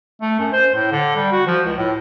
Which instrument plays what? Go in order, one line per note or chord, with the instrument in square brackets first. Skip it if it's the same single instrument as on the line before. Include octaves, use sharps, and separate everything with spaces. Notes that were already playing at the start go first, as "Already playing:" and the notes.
[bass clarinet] A3
F#2
C5
A2
D3
G3
F#4
F3
C#2
A2